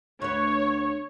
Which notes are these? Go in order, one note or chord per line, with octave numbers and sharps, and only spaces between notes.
D2 B3 C#5